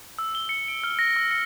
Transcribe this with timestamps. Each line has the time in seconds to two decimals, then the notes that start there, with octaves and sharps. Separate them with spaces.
0.19 E6
0.35 G7
0.49 C#7
0.68 D7
0.84 F6
0.99 A#6
1.16 E6
1.31 C#7